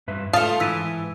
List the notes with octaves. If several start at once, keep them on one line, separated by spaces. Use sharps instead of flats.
G2 B4 E5
G#2 A3 F4 F5 A5 D#6
E3 E6 B6 D#7